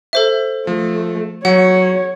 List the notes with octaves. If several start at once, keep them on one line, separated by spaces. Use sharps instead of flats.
A4 C5 E5
F3 A3
F#3 C#5 F#5